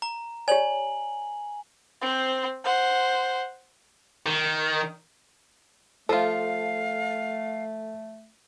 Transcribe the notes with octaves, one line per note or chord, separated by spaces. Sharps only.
A#5
G4 C#5 D5 G#5 F#7
C4 C5
C5 F#5
D#3
F3 A3 F4 A4 F5